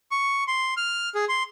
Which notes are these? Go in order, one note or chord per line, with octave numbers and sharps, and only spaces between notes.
C#6
C6
F6
G#4
C6